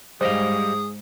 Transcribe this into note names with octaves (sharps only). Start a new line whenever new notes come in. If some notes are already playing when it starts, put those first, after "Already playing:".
G#2 G3 G#4 C5 D#5 F5